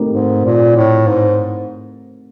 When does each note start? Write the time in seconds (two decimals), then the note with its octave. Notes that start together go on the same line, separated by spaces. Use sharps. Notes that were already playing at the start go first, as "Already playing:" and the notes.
Already playing: A3 C4 D#4 G4 A#4
0.13 G#2
0.45 A#2
0.76 A2
1.07 G#2